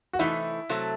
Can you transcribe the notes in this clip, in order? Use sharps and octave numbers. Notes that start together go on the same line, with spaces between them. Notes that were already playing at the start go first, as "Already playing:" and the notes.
F#4
C3 E3 A3 D#4 E4
C3 F#3 A3